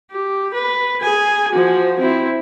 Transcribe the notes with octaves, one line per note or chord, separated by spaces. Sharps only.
G4
B4
G#4 G#5
F3 F#4
C4 E4